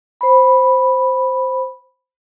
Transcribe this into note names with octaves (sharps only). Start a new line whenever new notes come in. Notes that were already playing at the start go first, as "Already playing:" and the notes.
C5 B5